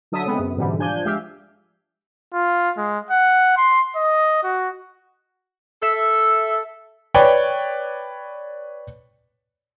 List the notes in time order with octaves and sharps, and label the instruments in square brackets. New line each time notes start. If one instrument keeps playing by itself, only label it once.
[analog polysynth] D3 F#3 A4 E5 D#6
C#3 G#3 B3 C4
F#2
G#2 B2 D3 E3 G3
F3 D4 G#5 G6
G#3 G4 E5 F5
[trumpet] F4
G#3
F#5
C6
D#5
F#4
[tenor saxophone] A4 [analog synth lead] E5
[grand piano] B4 C#5 D5 G5